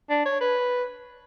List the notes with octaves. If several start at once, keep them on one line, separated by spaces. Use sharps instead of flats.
D4
C#5
B4